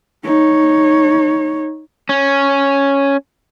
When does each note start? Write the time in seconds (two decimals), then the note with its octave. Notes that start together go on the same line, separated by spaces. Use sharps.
0.24 D#4 C#5
2.09 C#4